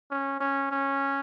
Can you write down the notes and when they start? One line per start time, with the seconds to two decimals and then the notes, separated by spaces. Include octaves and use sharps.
0.11 C#4
0.40 C#4
0.71 C#4